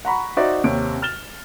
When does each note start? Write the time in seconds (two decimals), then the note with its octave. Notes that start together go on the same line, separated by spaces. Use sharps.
0.05 F#5 A#5 B5 C#6
0.37 D#4 F#4 C5 D5 E5
0.64 D#2 C3 C#5 D7
1.02 F6 A6 E7 G7